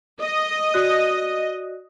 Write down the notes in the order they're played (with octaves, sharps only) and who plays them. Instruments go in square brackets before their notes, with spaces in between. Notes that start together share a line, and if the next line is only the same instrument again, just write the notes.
[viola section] D#5
[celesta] F#4 D5 F#6